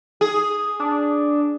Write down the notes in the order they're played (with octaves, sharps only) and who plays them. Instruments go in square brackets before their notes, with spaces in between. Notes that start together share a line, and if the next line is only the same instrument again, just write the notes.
[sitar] G#4
[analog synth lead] D4